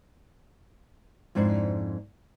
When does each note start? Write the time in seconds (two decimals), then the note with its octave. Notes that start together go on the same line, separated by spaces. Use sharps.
1.35 F2 G#2 D4 E4 C5